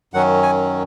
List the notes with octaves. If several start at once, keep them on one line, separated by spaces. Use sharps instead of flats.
F#2 D#3 F#3 C#4 F#5
G#5